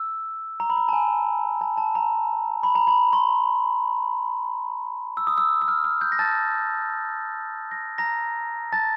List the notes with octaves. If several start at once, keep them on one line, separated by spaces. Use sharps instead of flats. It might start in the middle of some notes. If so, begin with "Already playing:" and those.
Already playing: E6
A#5
B5
A#5
A5
G#5
A5
A5
A#5
B5
A#5
B5
C6
E6
D#6
E6
E6
F6
F6
G6
A#6
A5 A6
A#6
A#5 A#6
A5 A6